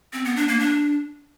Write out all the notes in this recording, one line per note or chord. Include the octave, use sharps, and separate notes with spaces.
C4
B3
D4
A#3
D4